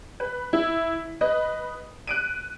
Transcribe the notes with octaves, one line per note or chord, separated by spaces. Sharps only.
B4
E4
B4 D#5
F#6 D7 D#7